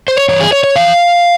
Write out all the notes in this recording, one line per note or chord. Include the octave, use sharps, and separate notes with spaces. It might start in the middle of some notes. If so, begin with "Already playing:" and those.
C5
C#5
G2 E3 C#5
G#4
C#5
C#5
F2 E3 F5